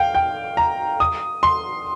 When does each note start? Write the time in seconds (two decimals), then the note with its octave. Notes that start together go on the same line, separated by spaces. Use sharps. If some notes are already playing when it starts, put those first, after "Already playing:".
Already playing: F5 G5
0.15 G5
0.57 A#5
1.00 D#6
1.43 C6